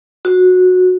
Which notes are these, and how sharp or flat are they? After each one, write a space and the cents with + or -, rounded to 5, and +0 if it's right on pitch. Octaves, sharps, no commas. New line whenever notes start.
F#4 -15